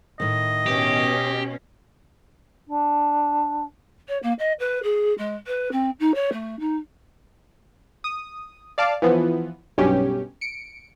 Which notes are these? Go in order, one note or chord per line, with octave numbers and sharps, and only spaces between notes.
A2 D#3 D#5
B2 C#4 G4
D4
C#5
A#3
D#5
B4
G#4
G#3
B4
C4
D#4
C#5
A3
D#4
D#6
D5 F5 A5 D6
E3 F3 B3
B1 G2 C#4 G4
C#7 D7